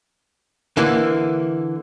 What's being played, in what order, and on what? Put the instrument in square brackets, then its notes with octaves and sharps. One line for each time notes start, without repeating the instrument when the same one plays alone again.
[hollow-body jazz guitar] D3 E3 A#3